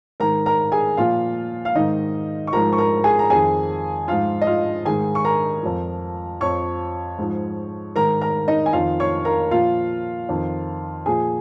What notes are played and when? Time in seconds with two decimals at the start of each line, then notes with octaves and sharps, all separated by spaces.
0.20 G#2 D#3 A#4 A#5
0.46 A#4 A#5
0.72 G#4 G#5
0.97 A#2 F3 F4 F5
1.65 F5
1.75 G#2 D#3 D#4 D#5
2.47 C#6
2.53 G#2 F3 A#4 A#5
2.73 C#6
2.78 A#4 A#5
3.04 G#4 G#5
3.19 A#5
3.30 F2 D#3 G#4 G#5
4.08 G#2 F3 F4 F5
4.42 D#5
4.47 F4 F5
4.85 G#2 D#3 G#4 G#5
5.15 C#6
5.25 A#4 A#5
5.63 F2 F3
6.41 F2 F3 C#5 C#6
7.18 G#2 F3
7.96 G#2 D#3 A#4 A#5
8.21 A#4 A#5
8.48 D#4 D#5
8.66 G#5
8.73 F2 D#3 F4 F5
9.00 C#5 C#6
9.25 A#4 A#5
9.51 A#2 F3 F4 F5
10.29 F2 D#3
11.06 A#2 F3 G#4 G#5